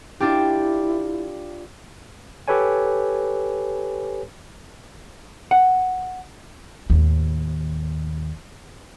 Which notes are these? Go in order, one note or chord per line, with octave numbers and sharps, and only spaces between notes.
D4 E4 F4 G4
G4 A4 B4 C#5 G#5
F#5
D#2 A2